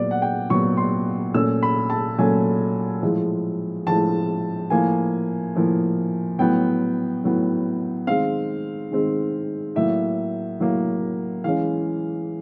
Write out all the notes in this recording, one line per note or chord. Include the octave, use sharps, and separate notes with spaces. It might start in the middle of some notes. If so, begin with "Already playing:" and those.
Already playing: A#2 F#3 B3 D5
F#5
G5
A#2 F#3 B3 C#6
C6
A#2 F#3 A3 C#4 E6
B5
A5
A#2 F#3 A3 C#4 G#5
A2 F3 G#3
A2 F3 G#3 A5
A2 F3 A#3 G#5
A2 F3 A#3
A2 F#3 B3 G5
A2 F#3 B3
D#3 G#3 C4 F5
D#3 G#3 C4
A2 F#3 A#3 E5
A2 F#3 A#3
E3 G#3 C#4 F5